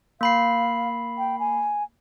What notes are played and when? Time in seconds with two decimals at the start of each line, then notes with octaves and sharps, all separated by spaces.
0.21 A#3 F5 B5 C7
1.18 G5
1.39 G#5